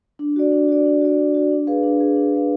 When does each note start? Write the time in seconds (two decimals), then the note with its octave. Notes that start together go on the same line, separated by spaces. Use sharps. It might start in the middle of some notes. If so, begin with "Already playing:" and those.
0.19 D4
0.36 F#4 D5
0.52 D4
0.68 F#4 D5
0.86 D4
1.02 F#4 D5
1.19 D4
1.34 F#4 D5
1.51 D4
1.67 G#4 B4 F5
1.83 D4
2.00 G#4 B4 F5
2.16 D4
2.33 G#4 B4 F5